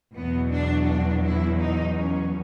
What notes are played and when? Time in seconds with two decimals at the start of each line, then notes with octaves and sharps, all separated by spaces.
0.14 E2 B2 F#3 B3
0.51 D4
0.86 D4
1.24 E4
1.60 D#4
1.97 C#4